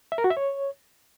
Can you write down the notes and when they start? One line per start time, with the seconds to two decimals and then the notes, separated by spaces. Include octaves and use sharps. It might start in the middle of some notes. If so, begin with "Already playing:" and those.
0.12 E5
0.18 A#4
0.24 F#4
0.30 E5
0.37 C#5